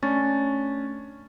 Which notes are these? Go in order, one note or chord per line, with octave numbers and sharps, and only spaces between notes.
A3 C#4 D4 C#6 A6